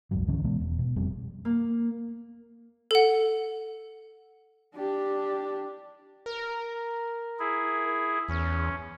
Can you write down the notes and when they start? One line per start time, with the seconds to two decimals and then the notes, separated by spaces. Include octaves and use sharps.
0.11 B1 F2 G#2 F#3
0.27 C#2 D3 E3 C#4
0.44 B2 E3 G#3 B3
0.60 E1
0.79 B2
0.96 F1 F2 G3 C4
1.45 A#3
2.91 A4 F#5
4.76 D4 G4
6.26 A#4
7.39 E4 G#4
8.29 E2 C#4